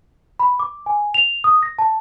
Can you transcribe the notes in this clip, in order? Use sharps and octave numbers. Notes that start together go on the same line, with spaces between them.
B5
D6
G#5
F7
D#6
A#6
A5